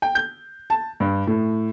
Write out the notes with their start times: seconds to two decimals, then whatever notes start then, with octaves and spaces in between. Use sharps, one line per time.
0.02 G5
0.15 G6
0.70 A5
1.00 G2
1.27 A2